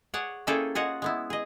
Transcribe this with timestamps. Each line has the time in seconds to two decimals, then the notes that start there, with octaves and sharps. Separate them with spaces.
0.14 G#4 C#5 D5 F#5
0.47 A#3 C#4 E4 G#4 A4 G5
0.75 F4 F#4 G#4 C#5 D#5 F#5
1.02 G#3 B3 E4
1.30 G#4 D#5